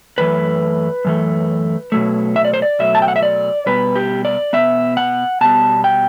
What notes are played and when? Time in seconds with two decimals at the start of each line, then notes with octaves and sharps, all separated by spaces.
0.18 F#2 E3 A3 B4
1.05 F#2 E3 A3
1.92 B2 F#3 A3
2.36 E5
2.45 D5
2.54 C5
2.62 D5
2.79 B2 F#3 A3 E5
2.95 A5
3.02 G5
3.08 F#5
3.16 E5
3.23 D5
3.66 B2 G3 B3 B4
3.96 G4
4.25 D5
4.53 B2 G3 B3 E5
4.97 F#5
5.41 B2 G3 B3 A5
5.84 G5